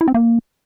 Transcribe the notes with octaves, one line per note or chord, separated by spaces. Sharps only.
E4
C4
A#3